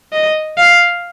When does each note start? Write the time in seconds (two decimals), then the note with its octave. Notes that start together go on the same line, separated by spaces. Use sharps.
0.13 D#5
0.58 F5